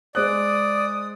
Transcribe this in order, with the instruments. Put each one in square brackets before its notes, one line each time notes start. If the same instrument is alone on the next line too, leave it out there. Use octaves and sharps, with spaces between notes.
[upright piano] G#3 C5 F#6 [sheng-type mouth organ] D5 [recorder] D#6